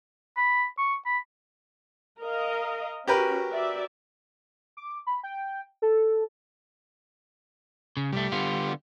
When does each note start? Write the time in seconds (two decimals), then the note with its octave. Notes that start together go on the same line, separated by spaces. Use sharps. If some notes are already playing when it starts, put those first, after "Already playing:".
0.37 B5
0.78 C#6
1.06 B5
2.21 A#4 D#5 F5
3.08 C#4 F#4 G4 A#4 B4
3.49 F#4 D5 E5
4.77 D6
5.07 B5
5.23 G5
5.82 A4
7.97 C#3
8.12 C2 G3 A3
8.32 D3 B3 F4